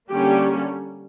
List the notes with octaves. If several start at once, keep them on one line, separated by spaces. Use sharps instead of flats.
D3 G3 A#3 C#4 G4